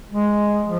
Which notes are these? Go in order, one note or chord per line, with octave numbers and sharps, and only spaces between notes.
G#3
F3